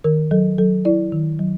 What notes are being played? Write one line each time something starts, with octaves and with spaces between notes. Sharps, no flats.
D#3 A#4
F#3 A4
F#3 A4
E4 D5
D#3
F#3